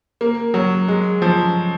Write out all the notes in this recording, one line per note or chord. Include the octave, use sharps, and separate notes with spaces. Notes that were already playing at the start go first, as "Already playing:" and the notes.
A#3
F#3
G#3
F3